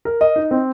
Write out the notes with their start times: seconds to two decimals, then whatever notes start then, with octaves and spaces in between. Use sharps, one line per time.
0.05 A#4
0.21 D#5
0.36 D#4
0.51 C4